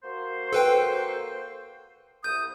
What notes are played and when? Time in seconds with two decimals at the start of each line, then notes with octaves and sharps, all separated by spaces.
0.03 A#3 F#4 C5
0.53 A4 B4 G5
2.24 C2 D#6 G6